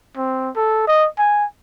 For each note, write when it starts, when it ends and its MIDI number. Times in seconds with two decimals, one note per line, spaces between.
0.17 0.50 60
0.56 0.86 69
0.88 1.07 75
1.19 1.45 80